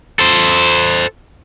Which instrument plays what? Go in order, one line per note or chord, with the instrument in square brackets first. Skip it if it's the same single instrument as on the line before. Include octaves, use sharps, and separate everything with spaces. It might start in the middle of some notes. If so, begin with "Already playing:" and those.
[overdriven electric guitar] A4 C5